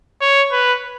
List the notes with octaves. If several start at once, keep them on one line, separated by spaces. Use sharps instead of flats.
C#5
B4